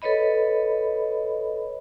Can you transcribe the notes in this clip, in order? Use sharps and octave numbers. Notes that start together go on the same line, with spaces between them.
A4 B4 C#5 D#5 B5